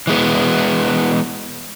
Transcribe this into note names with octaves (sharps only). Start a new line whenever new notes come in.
E3 G#3 B3